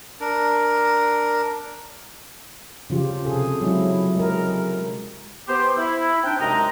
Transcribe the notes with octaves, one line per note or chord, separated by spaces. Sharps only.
D4 A#4
C#3 F3 F4 G4
C3 G#4 A4
F#3 G#3 E4
G#3 A#4
B3 G4 C5
E4
C4 D4 D#4 G5
F#2 C3 G#3 D#4 A#5